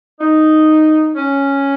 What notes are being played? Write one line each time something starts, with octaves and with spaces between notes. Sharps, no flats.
D#4
C#4